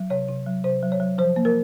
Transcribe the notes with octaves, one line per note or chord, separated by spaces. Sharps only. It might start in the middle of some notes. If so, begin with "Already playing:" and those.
Already playing: F#3
C3 C#5
C3
F#3
C3 C5
F#3
C#5
F#3
F3 C5
A#3
A#4